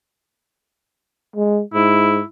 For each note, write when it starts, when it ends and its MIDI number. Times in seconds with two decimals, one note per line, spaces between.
1.36 1.62 56
1.74 2.21 44
1.74 2.25 64